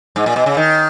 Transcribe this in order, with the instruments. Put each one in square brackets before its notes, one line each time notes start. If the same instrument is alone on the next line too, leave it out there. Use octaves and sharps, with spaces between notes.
[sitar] G#2
A#2
B2
C#3
D#3